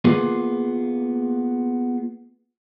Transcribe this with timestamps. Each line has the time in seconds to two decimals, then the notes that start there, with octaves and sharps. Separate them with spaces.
0.05 A#3 B3 F4 G#4 B4